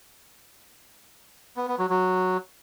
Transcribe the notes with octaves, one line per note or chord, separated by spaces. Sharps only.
B3
B3
F#3
F#3